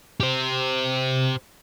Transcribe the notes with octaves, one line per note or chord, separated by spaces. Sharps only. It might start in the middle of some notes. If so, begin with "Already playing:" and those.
G4 C5